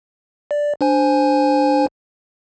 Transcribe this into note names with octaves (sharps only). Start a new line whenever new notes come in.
D5
D4 C5 G#5